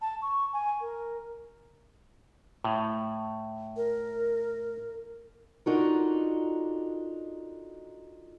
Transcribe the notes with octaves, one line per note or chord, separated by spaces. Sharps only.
A5
C#6
G#5
A#4
A2
A#4
D4 D#4 F4 F#4 A4 A#4